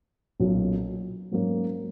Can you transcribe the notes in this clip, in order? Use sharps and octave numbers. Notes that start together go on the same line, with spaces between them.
B1 A#2 F#3 C#4 F#4
G#2 F#3 A#3 C#4